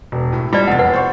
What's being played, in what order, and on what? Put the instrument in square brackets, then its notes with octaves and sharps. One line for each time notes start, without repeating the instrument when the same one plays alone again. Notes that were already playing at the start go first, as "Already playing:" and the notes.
[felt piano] E1
A2
[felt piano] G3 [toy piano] F4 D5
[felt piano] F1 E2 A6 [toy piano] F#5
[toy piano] B4 F#5
[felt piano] C5 C#6